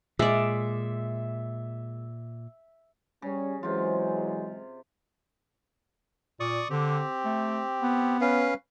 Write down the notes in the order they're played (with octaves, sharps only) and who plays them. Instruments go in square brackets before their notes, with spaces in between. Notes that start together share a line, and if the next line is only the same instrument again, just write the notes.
[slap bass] A#2 [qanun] G#3 D5 [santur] E5
[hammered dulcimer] C#3 [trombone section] G3 C#4
[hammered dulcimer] C3 F4 [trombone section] E3 F#3 G#3
[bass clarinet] A#2 [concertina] D5 C#6 D#6
[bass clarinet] D3 [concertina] C4 G4
[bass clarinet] A3
B3
[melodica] C#4 B4 F5